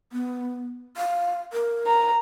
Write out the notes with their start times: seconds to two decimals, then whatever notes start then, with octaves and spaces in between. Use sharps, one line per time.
0.13 B3
0.97 F5
1.53 A#4
1.87 A#5